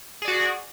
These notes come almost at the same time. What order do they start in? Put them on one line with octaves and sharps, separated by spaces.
G#4 D5 F#4